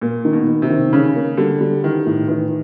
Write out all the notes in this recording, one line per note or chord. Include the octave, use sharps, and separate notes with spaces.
A#2 A#3
D#3
B2
A#3
C3
D#3
C#3 C#4
A#3
D3 G3
G3
D#3 E3
A2
D#3 E3